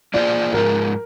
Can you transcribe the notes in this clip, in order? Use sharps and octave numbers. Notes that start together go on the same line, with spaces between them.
F3 A#3 F4 G#4 C5 D5
G#2 F3 G#3 A#4